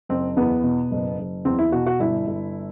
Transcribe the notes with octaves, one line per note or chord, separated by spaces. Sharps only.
F#1 C4
E2 B3
B2
F#1
F#1
E2 C4
E4
B2 F#4
F#4
G1 E4
G1